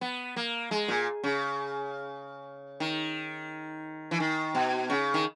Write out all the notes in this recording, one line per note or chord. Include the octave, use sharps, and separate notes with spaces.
B3
A#3
G#3
A#2
C#3
D#3
E3
D#3
B2
C#3
D#3